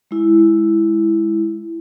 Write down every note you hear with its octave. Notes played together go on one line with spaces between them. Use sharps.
G#3 E4